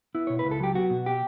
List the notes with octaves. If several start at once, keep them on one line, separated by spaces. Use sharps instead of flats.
B3 E4
B2 C#5
B4
C#2
A4
F#3 G4
B3 F#4
B2
G4